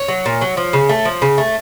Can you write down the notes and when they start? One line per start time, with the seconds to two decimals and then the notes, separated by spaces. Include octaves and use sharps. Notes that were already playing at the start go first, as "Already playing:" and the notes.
Already playing: C#5
0.08 F#3
0.26 A#2
0.41 F#3
0.57 F3
0.73 C#3
0.89 A3
1.05 F3
1.22 C#3
1.38 A3